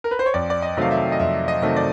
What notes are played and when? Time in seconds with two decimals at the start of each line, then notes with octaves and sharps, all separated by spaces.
0.04 A#4
0.11 B4
0.19 C5
0.26 C#5
0.34 F2 D5
0.50 D5
0.62 D#5
0.77 C3 D#3 F#3 A3 F5
0.91 E5
1.12 D#5
1.19 F2 E5
1.48 D#5
1.62 C3 D#3 F#3 A3
1.76 D5